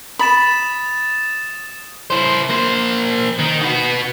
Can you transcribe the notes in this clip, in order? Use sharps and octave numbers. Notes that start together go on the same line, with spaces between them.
B5 D#6 A6 E7
E4 C5
A#3 C5
D#3
B3 F#4